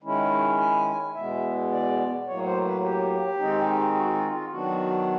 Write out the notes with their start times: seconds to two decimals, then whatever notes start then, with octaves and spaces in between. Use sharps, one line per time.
0.02 D#3 G#3 C#4 E4
0.59 G#5
1.14 E2 B2 G#3 B3 E5
1.71 D5
2.26 A2 F#3 A#3 C#5
2.45 C5
2.65 B4
2.82 G4
3.38 D#3 G#3 C4 D#4
3.95 F#4
4.14 F4
4.32 F4
4.50 D#3 F#3 B3 D4 F#4